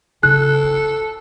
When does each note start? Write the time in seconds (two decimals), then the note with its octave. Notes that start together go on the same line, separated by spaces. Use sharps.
0.23 C#3 A4 F#6
0.64 E4